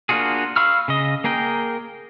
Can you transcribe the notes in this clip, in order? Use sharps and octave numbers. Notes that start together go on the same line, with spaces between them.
A#3 D4 F4 F#4 G#4
F5 B5 C#6 E6 F6
C#3 D#5
A#3 G#4 A#4 G5